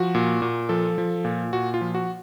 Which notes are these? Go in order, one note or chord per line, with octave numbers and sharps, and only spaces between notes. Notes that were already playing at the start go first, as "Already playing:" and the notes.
Already playing: F3 F#4
A#2
A#2
F3 A4
F3
A#2
A#2 F#4
F4
F3
F#4